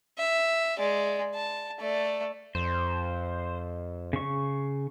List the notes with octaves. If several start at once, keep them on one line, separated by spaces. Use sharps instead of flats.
E5
G#3 D5
A5
A3 D5
F2 C5
C#3 C#6